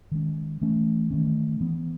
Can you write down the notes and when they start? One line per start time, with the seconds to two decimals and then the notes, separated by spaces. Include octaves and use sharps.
0.12 D#3 G#3 C#4
0.61 E3 A3 C#4
1.11 D#3 A3 C#4
1.60 E3 B3